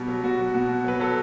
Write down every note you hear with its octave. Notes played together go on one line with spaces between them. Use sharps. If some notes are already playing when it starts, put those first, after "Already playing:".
Already playing: B2 G3
F#3
B2 F#4
F#3
B2 F#4
B2
F#3 B4
F#3 A4